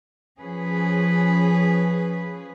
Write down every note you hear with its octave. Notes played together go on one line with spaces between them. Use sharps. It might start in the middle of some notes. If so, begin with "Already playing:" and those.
F3 C#4 G#4 B4